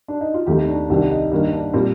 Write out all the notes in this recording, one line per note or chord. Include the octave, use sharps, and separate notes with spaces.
D4
D#4
F4
D#2 D#3 A3 C4 G4
D4
C2 C3 D#3 D4
D#4
G2 D#3 A#3 D#4
D4
A#2 G3 C4